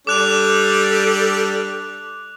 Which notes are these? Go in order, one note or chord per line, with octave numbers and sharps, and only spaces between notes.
G3 D4 A4 D5 D6 F#6 F7